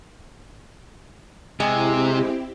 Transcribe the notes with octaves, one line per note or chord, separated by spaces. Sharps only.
C3 G#3 C4 E4 G4